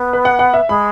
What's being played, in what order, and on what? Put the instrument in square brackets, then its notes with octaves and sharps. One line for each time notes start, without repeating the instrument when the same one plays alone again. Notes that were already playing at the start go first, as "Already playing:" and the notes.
Already playing: [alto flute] B3
[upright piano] B4
F#5
F#5
E5
[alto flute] G#3 [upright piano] B5